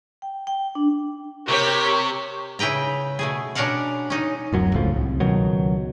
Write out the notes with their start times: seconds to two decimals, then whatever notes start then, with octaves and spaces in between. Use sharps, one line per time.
0.22 G5
0.47 G5
0.75 D4
1.48 C3 G4 A#4 C#5 C#6 B6
2.59 C#3 E4 B4 G5 A#5
3.19 B2 A3 G#4
3.55 B2 C#4 D4 A#4 F5 F#5
4.10 C#4 D#4
4.53 D1 F#2 F#3
4.74 F#1 C#2 A2 F3
4.96 C2
5.20 C#2 B2 D#3 F#3